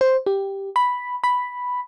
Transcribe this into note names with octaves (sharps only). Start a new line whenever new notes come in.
C5
G4
B5
B5